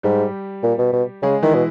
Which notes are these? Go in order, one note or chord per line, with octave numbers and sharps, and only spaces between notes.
G#2 G3 G4
A#2
B2
B2
C#3 G#3 G#4
D#3 E3 E4
B2